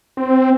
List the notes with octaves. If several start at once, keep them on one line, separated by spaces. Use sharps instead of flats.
C4